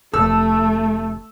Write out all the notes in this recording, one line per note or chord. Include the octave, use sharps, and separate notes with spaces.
F1 A3 A4 E6